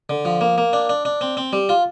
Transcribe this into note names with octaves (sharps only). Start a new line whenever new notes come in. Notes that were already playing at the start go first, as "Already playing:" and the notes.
D3
F3
A#3
A#3
D4
D4
D4
C4
C4
G3
F4